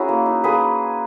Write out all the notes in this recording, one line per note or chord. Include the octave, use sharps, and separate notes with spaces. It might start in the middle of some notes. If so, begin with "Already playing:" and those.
Already playing: C#4 E4 F#4 G#4 A#4
A#3
D#4
A#3 G#4 B4